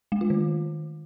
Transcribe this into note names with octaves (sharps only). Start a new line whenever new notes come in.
G#3
F4
D#3